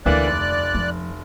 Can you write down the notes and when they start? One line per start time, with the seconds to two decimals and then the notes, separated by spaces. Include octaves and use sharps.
0.06 D2 D3 E3 A#3 D5 F#6
0.27 F1
0.75 F3